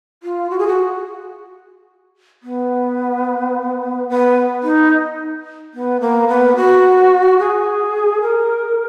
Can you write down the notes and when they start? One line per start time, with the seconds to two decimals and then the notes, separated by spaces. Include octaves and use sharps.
0.23 F4
0.51 F#4
0.59 G#4
0.67 F#4
2.43 B3
4.09 B3
4.63 D#4
5.74 B3
6.01 A#3
6.28 B3
6.56 F#4
7.39 G#4
8.21 A#4